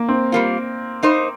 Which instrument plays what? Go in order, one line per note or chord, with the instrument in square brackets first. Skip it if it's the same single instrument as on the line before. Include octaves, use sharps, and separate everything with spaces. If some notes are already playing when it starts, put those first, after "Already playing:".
Already playing: [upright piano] A#3
C4
[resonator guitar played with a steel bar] G3 A#3 F4
A#3 D#4 C5